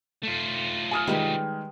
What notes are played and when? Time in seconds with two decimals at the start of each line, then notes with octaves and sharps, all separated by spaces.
0.23 A3 F4
0.91 G#5 D#6 F6
1.07 D#3 G3 G#3 G4 B4